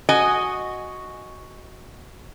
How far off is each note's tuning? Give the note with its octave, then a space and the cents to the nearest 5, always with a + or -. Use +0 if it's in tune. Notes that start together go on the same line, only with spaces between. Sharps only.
F#4 +0 D#5 +0 G#5 +0